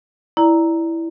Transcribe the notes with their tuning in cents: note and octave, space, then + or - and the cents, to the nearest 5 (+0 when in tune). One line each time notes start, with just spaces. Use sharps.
E4 +0 D5 +0 A#5 +0